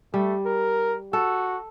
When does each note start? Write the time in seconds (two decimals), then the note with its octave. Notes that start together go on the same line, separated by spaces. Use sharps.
0.14 G3 A3
0.46 A#4
1.13 F#4 A4